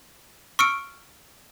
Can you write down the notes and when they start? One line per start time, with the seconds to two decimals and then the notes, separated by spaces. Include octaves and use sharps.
0.59 C#6 E6 F6 C#7 D7